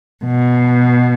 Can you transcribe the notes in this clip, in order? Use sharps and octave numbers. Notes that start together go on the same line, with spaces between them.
B2